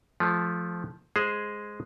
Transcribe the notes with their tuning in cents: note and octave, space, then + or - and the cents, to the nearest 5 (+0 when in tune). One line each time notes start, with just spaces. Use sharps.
F3 +0 A3 -25
G#3 +0 G#4 +0 C5 +0